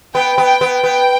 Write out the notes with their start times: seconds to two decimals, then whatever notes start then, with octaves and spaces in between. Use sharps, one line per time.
0.15 B3 G5
0.38 B3
0.46 G5
0.61 B3
0.75 G5
0.84 B3